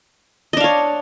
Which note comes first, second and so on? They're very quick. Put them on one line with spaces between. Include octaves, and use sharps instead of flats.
D#5 D4 F5 C#5